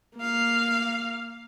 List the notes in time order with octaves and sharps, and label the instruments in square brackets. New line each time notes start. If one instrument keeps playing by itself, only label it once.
[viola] A#3 F5